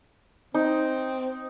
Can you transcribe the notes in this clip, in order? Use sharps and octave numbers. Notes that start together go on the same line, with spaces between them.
C4 D#4